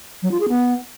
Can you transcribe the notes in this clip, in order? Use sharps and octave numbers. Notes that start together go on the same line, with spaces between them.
F#3
F4
G#4
B3